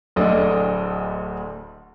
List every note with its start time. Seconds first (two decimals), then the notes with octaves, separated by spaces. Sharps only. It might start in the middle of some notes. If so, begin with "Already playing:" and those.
0.16 D1 D2 D4 A4 D#5